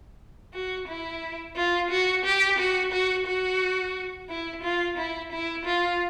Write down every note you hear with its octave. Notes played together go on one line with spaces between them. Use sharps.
F#4
E4
F4
F#4
G4
F#4
F#4
F#4
E4
F4
E4
E4
F4